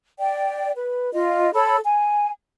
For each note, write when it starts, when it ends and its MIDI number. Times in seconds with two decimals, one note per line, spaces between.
0.19 0.71 74
0.19 0.71 79
0.76 1.13 71
1.14 1.49 65
1.14 1.49 75
1.54 1.77 69
1.54 1.77 73
1.54 1.77 83
1.54 1.77 88
1.84 2.30 80